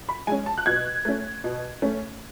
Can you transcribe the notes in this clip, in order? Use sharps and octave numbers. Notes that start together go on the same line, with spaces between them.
B5
G#3 C#4 G#5
A5
F#6
B2 G#6
A3 C#4
B2
A3 C#4